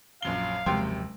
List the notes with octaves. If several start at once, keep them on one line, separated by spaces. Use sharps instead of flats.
A#1 F#2 F5 G7
F#1 D#2 C3 F3 F#3 G#3 G5 C6